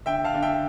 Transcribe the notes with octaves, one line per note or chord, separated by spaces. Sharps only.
D3 E5 G5
F5 A5
D3
E5 G5